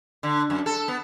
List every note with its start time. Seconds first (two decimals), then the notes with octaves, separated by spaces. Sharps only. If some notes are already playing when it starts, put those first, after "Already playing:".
0.23 D3
0.50 F#2
0.66 A4
0.88 B3